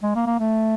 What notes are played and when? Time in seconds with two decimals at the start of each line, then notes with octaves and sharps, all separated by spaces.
0.03 G#3
0.16 A#3
0.27 A#3
0.40 A3